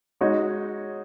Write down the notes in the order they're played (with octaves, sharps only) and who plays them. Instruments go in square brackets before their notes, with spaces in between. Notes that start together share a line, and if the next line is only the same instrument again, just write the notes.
[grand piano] G#3 D#4 F#4 C#5